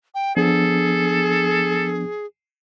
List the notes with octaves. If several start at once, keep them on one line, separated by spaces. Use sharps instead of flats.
G5
F3 B3 D4 G#4 A4